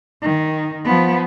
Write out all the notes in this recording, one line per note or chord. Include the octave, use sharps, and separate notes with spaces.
D#3
F3 B3